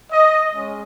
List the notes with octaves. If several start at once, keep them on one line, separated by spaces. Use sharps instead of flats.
D#5
G#3 C#4